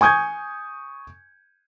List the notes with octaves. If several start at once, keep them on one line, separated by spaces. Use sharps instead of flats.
G#5 C#6 D#6 G6 G#6